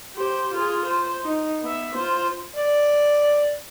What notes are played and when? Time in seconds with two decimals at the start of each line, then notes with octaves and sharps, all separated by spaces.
0.15 G4 C5
0.54 F4 G#4
0.86 C5
1.23 D#4
1.62 B3 E5
1.95 F4 C5
2.57 D5